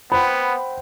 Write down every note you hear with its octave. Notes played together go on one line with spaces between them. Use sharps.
B3 C5 F#5 G5 B5